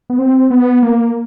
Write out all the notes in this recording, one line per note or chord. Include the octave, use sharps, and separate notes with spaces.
B3
C4
B3
A#3